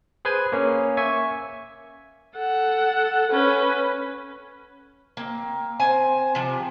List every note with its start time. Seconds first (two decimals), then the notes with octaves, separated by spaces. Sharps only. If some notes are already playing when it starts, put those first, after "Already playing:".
0.25 G#4 B4 C5 G#5
0.52 A#3 C#4
0.97 E5 G#5 C#6
2.36 A4 F#5
3.31 C#4 B4
5.17 A#3 C4
5.80 C4 C5 G#5
6.35 C3 F3